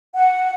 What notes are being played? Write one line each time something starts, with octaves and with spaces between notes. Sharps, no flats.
F#5